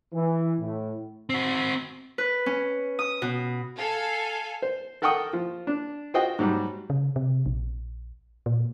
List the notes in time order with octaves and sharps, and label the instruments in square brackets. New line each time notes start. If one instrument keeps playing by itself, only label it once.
[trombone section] E3
A2
[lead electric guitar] C4 F#4
[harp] B4
C#4
D#6
B2
[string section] A4 F5 G#5
[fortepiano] C5
A4 A#4 F#5 G5 C#6 D#6
F3
D4
F4 F#4 C5 D#5 G5
G#2 F#3 G3
[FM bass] C#3
C3
A#1
A#2